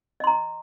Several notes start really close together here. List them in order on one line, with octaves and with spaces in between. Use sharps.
D#5 C6 A#5